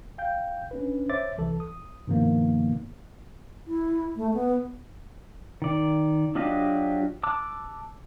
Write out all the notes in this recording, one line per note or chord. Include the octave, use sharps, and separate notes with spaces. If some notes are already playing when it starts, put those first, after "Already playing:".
F5 G5 G6
C#4 D4 B4
C5 C#5 E5 D6 A6
C2 E3 A4
D#6
G2 B2 D#3 F3 A#3 B3
E4
A3
B3
D#3 D5
F#3 D4 F4 G4 D#5
A5 D6 E6 F#6